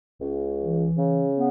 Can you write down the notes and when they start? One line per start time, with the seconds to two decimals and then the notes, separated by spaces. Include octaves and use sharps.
0.21 C#2
0.59 E3
0.96 C#3
1.34 B3